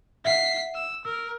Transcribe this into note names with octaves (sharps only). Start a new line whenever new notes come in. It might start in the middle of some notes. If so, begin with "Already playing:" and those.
E5 F#5 B6 C7
E6
A#4 E6